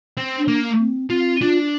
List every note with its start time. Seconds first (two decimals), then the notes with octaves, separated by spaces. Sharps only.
0.17 C4
0.38 D4
0.48 A#3
0.80 C4
1.10 C4 F4
1.41 D4 F4